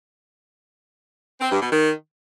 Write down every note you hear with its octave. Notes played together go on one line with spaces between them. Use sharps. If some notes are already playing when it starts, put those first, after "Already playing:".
C4
G2
B2
D#3